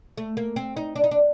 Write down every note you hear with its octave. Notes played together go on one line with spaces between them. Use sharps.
A3
A#3
C4
D#4
D4
D#4
D4